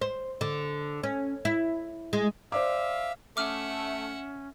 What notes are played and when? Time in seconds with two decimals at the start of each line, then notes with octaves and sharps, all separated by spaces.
0.01 C5
0.41 D3
1.03 C#4
1.45 E4
2.13 G#3
2.52 C5 D5 E5 F5 D6
3.37 A3 C#4 E5 F#5 D6 F6